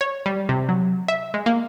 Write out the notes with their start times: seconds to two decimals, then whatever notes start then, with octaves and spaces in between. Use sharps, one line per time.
0.01 C#5
0.26 G3
0.49 C3
0.69 F#3
1.08 E5
1.34 G#3
1.46 A#3